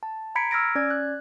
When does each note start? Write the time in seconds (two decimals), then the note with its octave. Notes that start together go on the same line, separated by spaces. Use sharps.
0.03 A5
0.35 A#5 B5 G#6 B6 C#7 D7
0.51 E6 F6 G#6 A#6 D7
0.75 C#4 D5 G#6
0.90 F#6